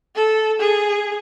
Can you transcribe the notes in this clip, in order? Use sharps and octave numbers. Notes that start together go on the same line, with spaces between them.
A4
G#4